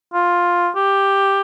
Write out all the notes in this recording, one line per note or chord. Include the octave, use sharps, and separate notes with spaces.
F4
G4